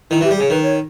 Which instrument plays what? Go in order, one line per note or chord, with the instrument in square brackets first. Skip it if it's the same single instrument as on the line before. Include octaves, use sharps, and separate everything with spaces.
[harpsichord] D#3 [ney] E4
[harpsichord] E3
[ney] G4
[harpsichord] G3
[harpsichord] C#3 [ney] G#4
[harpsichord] D#3 [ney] B4
[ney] C#5